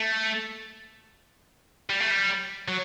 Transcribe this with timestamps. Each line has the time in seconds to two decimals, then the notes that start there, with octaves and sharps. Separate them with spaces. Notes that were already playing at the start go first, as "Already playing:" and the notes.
Already playing: A3
1.90 G3
2.00 A3
2.11 G3
2.68 F#3